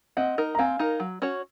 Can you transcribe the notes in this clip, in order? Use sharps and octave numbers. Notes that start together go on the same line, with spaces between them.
C4 D#5 F#5
D#4 A#4
A#5
C4 F5 G#5
D#4 A#4
F#3
C#4 F#4 C#5